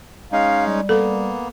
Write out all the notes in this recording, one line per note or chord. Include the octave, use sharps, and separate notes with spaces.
G#3 C#4 D#4 F5
G3
A#3 B3 A4